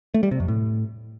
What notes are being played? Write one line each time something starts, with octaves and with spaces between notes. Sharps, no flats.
A3
G3
C3
F2
A2